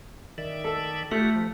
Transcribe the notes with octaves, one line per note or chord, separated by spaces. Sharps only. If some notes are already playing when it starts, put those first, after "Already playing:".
D#3 D5 E5
A4
A3 F4 G4 F#5
F3